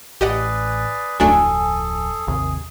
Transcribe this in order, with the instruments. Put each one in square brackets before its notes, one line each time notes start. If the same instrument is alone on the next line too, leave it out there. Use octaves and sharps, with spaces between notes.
[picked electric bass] A1 [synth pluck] G4 D#5 F#5 [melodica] G#4 B4 D5
[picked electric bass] D1 F2 [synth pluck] F#3 A3 D4 [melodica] G#4 A4 [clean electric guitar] G#5
[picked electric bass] G#1 D#2 C3 [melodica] G#4